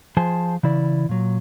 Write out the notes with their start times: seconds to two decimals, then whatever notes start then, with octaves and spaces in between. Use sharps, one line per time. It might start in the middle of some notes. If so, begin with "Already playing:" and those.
0.17 F3 G#4 C5 G#5 A5
0.63 C#3 E3 E4 D5
1.09 A#2 F#3